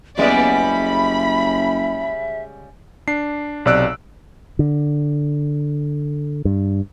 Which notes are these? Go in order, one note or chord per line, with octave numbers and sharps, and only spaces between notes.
F#1 C#3 G3 G#3 B3 D5 E5
B5
D4 C7
B1 C3 D5 E6 F#6 D7
D3
G2